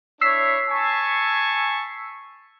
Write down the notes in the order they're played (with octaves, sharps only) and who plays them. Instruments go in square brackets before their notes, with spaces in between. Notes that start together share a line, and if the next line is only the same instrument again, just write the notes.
[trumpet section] D4 E4 C#5 [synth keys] E6 B6 C7
[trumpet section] G#5 A5 C#6